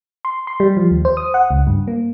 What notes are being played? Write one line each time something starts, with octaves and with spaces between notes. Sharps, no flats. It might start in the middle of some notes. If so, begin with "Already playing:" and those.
C6
C6
G3
F3
D#2
C5
D#6
F#5
C#2
G2
A#3